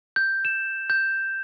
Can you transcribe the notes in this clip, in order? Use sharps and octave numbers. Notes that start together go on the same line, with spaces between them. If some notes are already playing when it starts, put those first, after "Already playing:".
G6
E7
G6